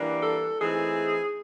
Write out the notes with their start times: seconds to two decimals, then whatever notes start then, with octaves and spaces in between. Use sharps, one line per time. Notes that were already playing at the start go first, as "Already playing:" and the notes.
Already playing: E3 G3 A#3 D4
0.23 A4
0.60 E3 A3 C4 D#4 G#4